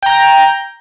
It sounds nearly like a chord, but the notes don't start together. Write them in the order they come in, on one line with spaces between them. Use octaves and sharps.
G5 A#5 G6